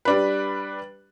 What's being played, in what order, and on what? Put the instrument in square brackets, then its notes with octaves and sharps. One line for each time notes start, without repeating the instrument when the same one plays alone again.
[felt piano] G3 D4 B4